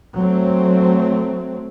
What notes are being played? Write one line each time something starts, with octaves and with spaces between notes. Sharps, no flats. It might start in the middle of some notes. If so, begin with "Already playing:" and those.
F#3 A3 C4